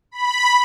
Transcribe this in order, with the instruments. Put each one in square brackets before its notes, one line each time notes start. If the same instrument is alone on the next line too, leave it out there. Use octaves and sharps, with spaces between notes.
[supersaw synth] B5